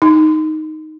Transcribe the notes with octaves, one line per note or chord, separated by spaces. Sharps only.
D#4